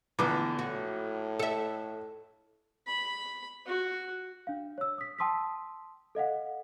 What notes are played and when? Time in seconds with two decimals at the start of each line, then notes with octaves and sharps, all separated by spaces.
0.19 A#1 D3 E3 B3 D6
0.59 A2 F#4
1.39 A4 E5
2.87 B5
3.66 F#4
4.47 D4 F5
4.78 C#5 E6
4.98 D#6 B6
5.19 G5 A5 C6 D#6 E6 B6
6.15 A4 D#5 F5 F#5